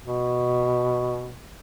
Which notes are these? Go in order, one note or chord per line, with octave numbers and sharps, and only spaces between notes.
B2